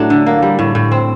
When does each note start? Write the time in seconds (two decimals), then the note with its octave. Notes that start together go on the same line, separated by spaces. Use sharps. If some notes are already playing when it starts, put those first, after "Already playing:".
Already playing: A2 F#3 A3 D4
0.10 D3
0.26 A#3
0.42 G3
0.59 A2
0.75 A2
0.91 C4